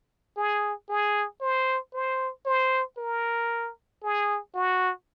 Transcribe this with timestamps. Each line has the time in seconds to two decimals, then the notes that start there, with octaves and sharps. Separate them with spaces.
0.37 G#4
0.89 G#4
1.41 C5
1.94 C5
2.46 C5
2.98 A#4
4.03 G#4
4.55 F#4